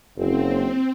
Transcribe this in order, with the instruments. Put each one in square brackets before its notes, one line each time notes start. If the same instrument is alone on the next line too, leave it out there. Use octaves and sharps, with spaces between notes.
[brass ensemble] F#1 [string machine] C4